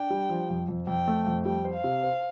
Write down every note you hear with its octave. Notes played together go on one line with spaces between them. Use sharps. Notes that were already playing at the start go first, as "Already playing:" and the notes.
Already playing: D4 G5
G3
F3
F2
F2
F2 G5
A3
F2
G3 G5
C5
F5
C3
C5